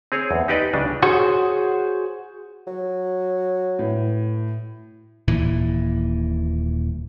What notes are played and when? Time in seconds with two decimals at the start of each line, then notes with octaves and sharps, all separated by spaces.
0.12 C4 G#4 C#5
0.31 E2
0.48 D#4 G4 B4 D5 D#5
0.74 C#2 C#3 D4
1.03 F#4 G#4 C5 C#5 F#5
2.67 F#3
3.79 A2 B4
5.28 D#1 A#2 E3